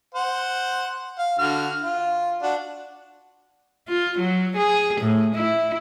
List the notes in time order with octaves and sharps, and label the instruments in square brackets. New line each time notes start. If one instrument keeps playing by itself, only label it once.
[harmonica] C5 F#5
F5
D3 F#4 F6
F4
D4 F#4
[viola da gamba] F4
F#3
G#4
A2
E4